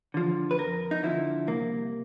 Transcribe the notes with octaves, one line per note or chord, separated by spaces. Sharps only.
D3 F3
B4
F2 A#4
D#4
D3 F3 E4
C2 A#3